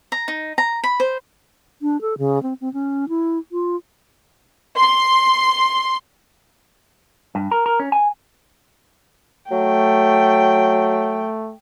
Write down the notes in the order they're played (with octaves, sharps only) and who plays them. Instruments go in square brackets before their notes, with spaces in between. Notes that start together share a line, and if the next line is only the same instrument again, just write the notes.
[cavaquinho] A#5
D#4
A#5
B5
C5
[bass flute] D4
A4
C#3
C4
C4
C#4
E4
F4
[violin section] C6
[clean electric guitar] G2
A#4
A#4
C#4
G#5
[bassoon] F#3 [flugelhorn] A3 [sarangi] G5